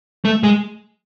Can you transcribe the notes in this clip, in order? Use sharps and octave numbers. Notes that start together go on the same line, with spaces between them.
A3
G#3